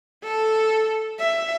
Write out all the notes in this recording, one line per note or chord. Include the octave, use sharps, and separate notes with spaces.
A4
E5